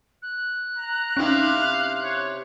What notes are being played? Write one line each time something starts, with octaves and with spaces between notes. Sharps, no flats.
F#6
A#5
C3 C4 C#4 D#4 E4 F5
C#5